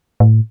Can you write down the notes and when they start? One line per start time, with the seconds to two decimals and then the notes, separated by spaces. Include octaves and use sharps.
0.20 A2